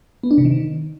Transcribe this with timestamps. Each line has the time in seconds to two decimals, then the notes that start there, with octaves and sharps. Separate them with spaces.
0.23 B3
0.31 D4
0.38 C3
0.45 D#3